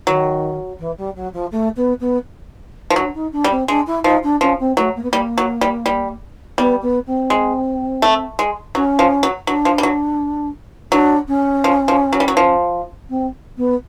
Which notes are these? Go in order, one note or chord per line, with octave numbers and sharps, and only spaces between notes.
D#3 F#3
E3
G3
F#3
F3
A3
B3
B3
F3
F#3 D4
D#4
D4
G3
C4
G#3 D4
E4
F3 D#4
D4
F3 C#4
C4
F#3 A3
A#3
B3
G3 A#3
F#3
G3
G3
G3 B3
B3
C4
G#3
A3
G#3
F#3 C#4
F3
F#3
F#3 D4
F3
G3
F#3
F#3 D4
C#4
F3
F3
F#3
G3
F#3
F3
C4
B3